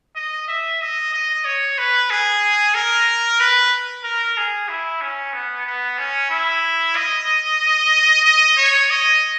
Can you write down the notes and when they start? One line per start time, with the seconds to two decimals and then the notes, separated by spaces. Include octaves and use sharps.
0.16 D#5
0.48 E5
0.81 D#5
1.13 D#5
1.45 C#5
1.78 B4
2.10 G#4
2.74 A#4
3.40 B4
4.04 A#4
4.37 G#4
4.69 E4
5.02 C#4
5.33 B3
5.66 B3
5.98 C#4
6.30 E4
6.96 D#5
8.25 D#5
8.57 C#5
8.90 D#5